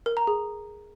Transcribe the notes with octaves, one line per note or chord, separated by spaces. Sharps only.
A#4
A#5
G#4